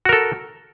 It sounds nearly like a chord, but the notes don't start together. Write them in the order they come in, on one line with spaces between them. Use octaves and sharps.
F#4 A#4 A4